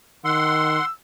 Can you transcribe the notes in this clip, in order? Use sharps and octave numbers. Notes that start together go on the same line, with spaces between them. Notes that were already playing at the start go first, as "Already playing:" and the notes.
D#3 F#5 C6 E6